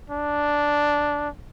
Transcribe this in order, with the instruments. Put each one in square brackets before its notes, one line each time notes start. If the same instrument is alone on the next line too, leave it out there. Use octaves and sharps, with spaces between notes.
[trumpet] D4